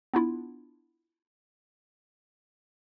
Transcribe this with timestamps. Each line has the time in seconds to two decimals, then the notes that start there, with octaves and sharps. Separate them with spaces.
0.14 B3 D4 E4 F4